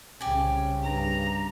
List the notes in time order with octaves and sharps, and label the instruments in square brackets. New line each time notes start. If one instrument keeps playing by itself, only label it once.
[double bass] C2 C#3 [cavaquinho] G4 G#5
[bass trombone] G2 [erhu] A#5